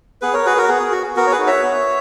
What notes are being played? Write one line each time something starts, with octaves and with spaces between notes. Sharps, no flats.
B3 G#4 B4
A#4 C#5
F#4 G#4 B4
F#4 A#4
B3 G#4
F#4
B3 F#4 A#4
C#5
G#4 B4
D#4 F#4
C#5 E5
B3